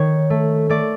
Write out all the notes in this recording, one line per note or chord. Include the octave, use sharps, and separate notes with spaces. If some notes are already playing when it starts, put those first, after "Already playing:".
Already playing: D#3 C#5
A3
A3 D5